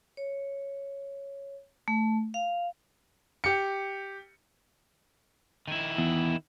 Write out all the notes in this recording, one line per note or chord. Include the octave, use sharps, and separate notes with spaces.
C#5
A3
F5
G4 C#7
D#3 E4
E2